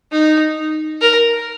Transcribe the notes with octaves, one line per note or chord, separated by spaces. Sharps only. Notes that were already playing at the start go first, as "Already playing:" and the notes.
D#4
A#4